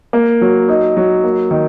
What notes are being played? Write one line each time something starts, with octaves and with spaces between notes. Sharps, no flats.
A#3
F#3
D#4
F#3
A#3
D#3